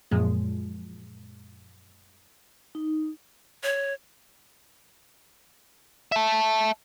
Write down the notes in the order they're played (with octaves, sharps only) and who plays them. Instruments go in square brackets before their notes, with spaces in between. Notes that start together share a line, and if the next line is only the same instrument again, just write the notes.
[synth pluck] F#2 A#2 F3 G#3
[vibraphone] D#4
[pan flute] C#5
[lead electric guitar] E5 A5